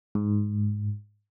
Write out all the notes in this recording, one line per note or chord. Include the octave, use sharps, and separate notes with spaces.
G#2